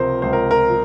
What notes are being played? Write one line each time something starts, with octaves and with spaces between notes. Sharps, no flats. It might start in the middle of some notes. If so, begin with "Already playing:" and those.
Already playing: C#2 C3 F3 A#4 C5
C#2 C5
A#4
A#4
F3